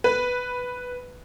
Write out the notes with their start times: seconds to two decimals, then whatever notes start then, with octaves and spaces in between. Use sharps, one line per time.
0.04 B4